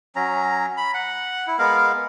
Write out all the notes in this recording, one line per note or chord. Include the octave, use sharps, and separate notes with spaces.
F#3 C#4 A#5
B5
F#5
E4
G#3 B3 A#4 F5